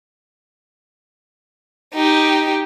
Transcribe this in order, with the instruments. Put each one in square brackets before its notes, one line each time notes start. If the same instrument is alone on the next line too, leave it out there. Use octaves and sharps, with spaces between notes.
[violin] D#4 G4